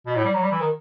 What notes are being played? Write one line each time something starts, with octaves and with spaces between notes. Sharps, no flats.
B2
A2
G3
F#3
G3
E3
D#3